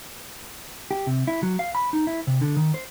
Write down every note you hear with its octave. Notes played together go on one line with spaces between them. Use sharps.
G4
C3
E4
F#3
F5
B5
D#4
E4
C3
D3
D#3
C5